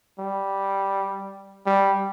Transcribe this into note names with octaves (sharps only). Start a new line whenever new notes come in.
G3
G3